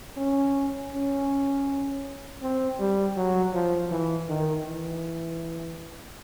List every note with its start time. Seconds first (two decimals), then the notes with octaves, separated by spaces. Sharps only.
0.17 C#4
0.93 C#4
2.42 C4
2.80 G3
3.17 F#3
3.53 F3
3.91 E3
4.29 D#3
4.66 E3